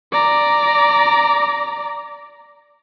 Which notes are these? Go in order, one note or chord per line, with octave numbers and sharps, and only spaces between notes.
D5 A#5